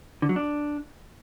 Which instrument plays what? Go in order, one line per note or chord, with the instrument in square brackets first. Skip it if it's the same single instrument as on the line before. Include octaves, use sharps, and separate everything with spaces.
[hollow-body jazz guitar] D3
F#3
D4